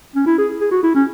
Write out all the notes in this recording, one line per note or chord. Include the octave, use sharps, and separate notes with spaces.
C#4
E4
G#4
G#4
F#4
E4
C#4